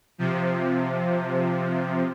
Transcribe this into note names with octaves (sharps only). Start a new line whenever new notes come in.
C3 F3